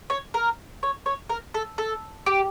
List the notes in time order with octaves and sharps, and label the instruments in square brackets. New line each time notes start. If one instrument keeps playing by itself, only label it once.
[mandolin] C#5
A#4
C#5
C#5
A#4
A4
A4
G4